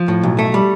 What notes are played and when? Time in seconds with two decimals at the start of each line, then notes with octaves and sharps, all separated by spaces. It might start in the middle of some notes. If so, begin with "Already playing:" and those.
Already playing: F3
0.08 A2
0.23 B1
0.39 A3
0.54 G3